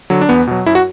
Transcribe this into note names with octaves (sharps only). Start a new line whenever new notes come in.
D3 F#3
D4
E2 B3
B2 F#3
F#2 E4
F#4